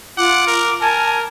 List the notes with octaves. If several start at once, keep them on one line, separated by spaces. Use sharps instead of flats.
F4 F#5 D6
A#4
A#4 G#5 A5